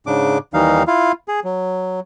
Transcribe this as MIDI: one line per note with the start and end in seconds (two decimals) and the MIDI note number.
0.07 0.38 44
0.07 0.38 49
0.07 0.38 62
0.07 0.38 86
0.54 0.83 39
0.54 0.83 52
0.54 0.83 55
0.54 0.83 63
0.54 0.83 77
0.87 1.12 64
0.87 1.12 65
0.87 1.12 77
1.28 1.40 68
1.44 2.00 54